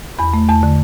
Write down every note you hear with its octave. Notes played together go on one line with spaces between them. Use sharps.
E2 B5
A3
E2 A5
D3